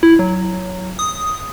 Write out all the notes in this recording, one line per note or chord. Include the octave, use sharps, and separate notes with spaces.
E4
F#3
D#6